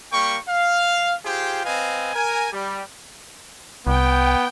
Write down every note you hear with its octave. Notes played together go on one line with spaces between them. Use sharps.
G3 A#3 G5 C#6
F5
F4 G4 G#4 C5 G5
C4 B4 D#5 F5 G#5
A#4 G#5
G3
C2 B3 G5